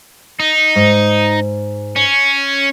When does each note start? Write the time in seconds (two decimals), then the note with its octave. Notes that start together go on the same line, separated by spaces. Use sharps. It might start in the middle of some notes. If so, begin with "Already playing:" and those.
0.40 D#4
0.76 G#2
1.96 C#4